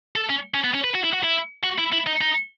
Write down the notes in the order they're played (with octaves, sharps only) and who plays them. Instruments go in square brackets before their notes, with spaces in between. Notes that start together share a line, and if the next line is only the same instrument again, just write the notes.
[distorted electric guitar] A4
C#4
C#4
B3
C#4
B4
F#4
E4
F#4
E4
F#4
E4
E4
D#4
D#4